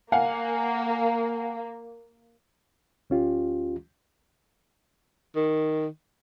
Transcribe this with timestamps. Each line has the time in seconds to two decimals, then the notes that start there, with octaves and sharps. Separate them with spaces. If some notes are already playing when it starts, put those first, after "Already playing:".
0.12 A#3 F5 F#5 G#5
3.10 D2 C#4 F4 G4
5.36 D#3